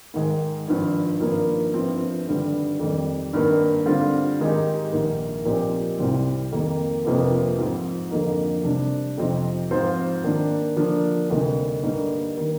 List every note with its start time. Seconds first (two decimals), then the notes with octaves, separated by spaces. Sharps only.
0.14 G#2 D#3 G#3
0.67 G#1 G2 F3
1.20 G#1 G2 F3 A#3
1.74 G1 G2 F3 C4
2.26 G#1 G2 D3 G3
2.79 F2 D#3 G3
3.33 G#1 G2 D#3 A#3
3.86 D3 G3 C4 F4
4.39 G#2 D#3 G#3 D#4 G4
4.93 A#1 G#2 D#3 A#3
5.45 A#2 F3 C4 D#4 G4
5.99 C2 C3 G3 C4
6.52 F2 D#3 A#3
7.05 G1 F2 C3 F3 A#3
7.58 G#2 F3 C4
8.11 F2 D3 F3 A#3 D#4
8.64 C3 G3 D4
9.18 F2 C3 F3 C4 D#4
9.71 G#2 F3 C4 F4 C5
10.24 D#3 A#3 D4
10.76 D3 F3 A#3 D4
11.30 D2 C3 G3 A#3 D#4
11.82 G2 D3 G3 A#3 D#4
12.37 D#3 A#3